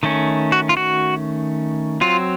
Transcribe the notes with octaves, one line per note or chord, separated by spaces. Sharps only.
D#3 A3 C#4
F#4
F4
F#4
F#3 C4 F4